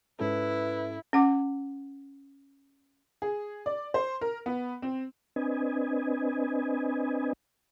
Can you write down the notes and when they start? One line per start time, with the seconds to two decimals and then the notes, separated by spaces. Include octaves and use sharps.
0.20 G#2 C#4 E4 A4 B4
1.13 C#4 F#5 D6
3.22 G#4
3.66 D5
3.94 C5
4.21 A#4
4.46 B3
4.82 C4
5.36 C4 D4 B4 D#5 G#5